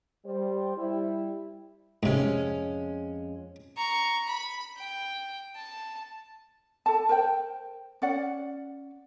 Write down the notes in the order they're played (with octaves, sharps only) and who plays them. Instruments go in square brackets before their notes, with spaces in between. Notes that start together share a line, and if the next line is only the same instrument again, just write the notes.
[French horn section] G3 C5
G3 E4
[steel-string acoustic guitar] F2 G#3 C#4 [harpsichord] G#2 C3
[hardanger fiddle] A#5 C#6
B5
G5
A5
[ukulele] A4 A5
A#4 C5 G5
C#4 D5 F#5